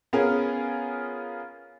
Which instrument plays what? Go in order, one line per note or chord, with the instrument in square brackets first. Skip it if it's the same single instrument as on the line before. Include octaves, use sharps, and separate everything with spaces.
[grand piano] B3 C#4 F4 G#4 A#4